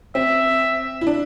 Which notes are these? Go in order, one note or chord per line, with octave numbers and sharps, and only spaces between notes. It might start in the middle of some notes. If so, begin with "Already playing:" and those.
C4 E5
E4
D4